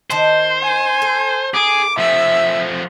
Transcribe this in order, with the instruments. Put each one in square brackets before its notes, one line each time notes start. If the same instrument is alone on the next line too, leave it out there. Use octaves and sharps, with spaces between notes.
[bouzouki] D#3 D#4 A5 [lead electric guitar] C5
[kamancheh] G#5
[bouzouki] A4
[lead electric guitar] G#4 [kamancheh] D6
[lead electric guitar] F3 A3 [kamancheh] E5